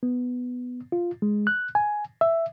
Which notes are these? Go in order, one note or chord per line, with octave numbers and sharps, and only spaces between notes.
B3
F4
G#3
F#6
G#5
E5